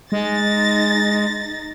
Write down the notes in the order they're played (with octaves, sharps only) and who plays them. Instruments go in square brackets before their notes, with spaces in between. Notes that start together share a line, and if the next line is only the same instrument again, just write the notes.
[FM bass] G#3 [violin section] D#4 A6 A#6